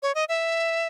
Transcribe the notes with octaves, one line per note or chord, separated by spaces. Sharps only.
C#5
D#5
E5